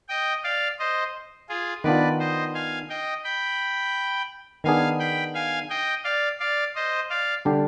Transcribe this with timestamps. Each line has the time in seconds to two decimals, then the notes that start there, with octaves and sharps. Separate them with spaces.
0.09 D#5 G5
0.44 D5 F5
0.79 C5 D#5
1.49 F4 G#4
1.84 D#3 B3 D4 F4 B4 D5
2.19 C5 D#5
2.55 F5 G#5
2.89 D#5 G5
3.24 G5 B5
4.64 D#3 B3 D4 G#4 F5 G#5
5.00 G5 B5
5.35 F5 G#5
5.70 D#5 G5
6.04 D5 F5
6.40 D5 F5
6.75 C5 D#5
7.10 D5 F5
7.45 D3 G3 D4 G4